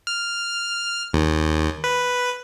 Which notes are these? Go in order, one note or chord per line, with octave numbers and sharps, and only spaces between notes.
F6
D#2
B4